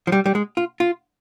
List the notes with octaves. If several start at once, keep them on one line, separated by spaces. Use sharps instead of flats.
F3
G3
G3
G#3
F4
F4